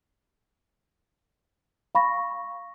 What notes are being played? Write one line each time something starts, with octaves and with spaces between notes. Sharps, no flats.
F5 B5 C#6 A#6